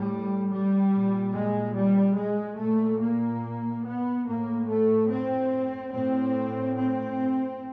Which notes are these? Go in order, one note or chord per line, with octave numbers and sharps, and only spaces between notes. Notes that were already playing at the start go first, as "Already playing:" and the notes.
Already playing: A2 G3
G3
A#2
G#3
G3
G#3
A#2 A3
A#3
B3
A2 A#3
A3
C4
A2 C4
C4